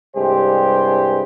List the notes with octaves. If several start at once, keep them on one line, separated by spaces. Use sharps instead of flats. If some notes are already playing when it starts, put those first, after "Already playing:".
C2 G2 G#3 G4 C5